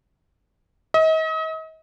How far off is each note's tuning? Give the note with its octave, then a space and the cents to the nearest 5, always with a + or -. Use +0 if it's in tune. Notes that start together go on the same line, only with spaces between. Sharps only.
D#5 +40